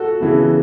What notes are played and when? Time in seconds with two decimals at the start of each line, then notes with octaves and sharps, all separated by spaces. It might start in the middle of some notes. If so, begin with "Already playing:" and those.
Already playing: F#4 A4
0.20 C#3 E3 B3